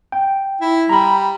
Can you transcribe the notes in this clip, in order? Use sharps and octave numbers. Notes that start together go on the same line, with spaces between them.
G5
E4
G3 A#5 B5